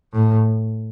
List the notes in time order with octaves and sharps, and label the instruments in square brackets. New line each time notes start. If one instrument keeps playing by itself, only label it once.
[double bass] A2